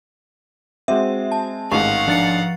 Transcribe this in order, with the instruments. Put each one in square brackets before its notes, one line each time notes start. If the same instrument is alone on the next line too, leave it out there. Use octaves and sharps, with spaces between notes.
[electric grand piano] G#3 C4 [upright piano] F#4 C5 [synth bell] E5
[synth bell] A5
[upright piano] A1 G#2 D#3 [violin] F5 F#5 [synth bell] C#6
[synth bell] F3 A6 C#7 [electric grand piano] D4